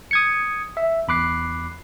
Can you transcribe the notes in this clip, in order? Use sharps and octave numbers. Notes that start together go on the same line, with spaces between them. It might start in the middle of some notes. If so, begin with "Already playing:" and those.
D#6 G#6 C#7
E5
E2 B5 D6 F#6 C7